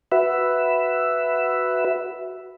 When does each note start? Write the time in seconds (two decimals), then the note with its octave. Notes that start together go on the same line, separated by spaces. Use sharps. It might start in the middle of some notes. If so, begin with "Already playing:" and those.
0.12 F#4 B4 E5